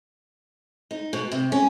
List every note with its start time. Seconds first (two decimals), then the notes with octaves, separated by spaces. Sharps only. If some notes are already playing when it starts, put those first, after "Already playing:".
0.91 D#4
1.13 B2
1.32 C3
1.52 C#4